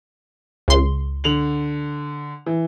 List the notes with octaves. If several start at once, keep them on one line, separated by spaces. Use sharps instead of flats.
C#2 C6
D3 F7 F#7
E3